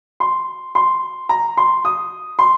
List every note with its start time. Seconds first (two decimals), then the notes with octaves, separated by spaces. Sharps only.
0.20 C6
0.75 C6
1.29 A#5
1.57 C6
1.85 D#6
2.39 C6